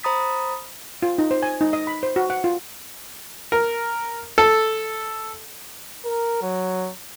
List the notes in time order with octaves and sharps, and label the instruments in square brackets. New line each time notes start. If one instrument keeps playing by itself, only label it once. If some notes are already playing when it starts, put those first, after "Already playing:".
[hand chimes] C5 A#5 B5 D#6 A6 B6
[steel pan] F4
D#4
C5
G#5
D#4
D#5
B5
C5
F#4
F#5
F4
[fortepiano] A#4
A4
[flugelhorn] A#4
F#3